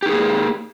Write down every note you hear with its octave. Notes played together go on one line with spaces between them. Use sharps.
A#3 D#4 G4 G#4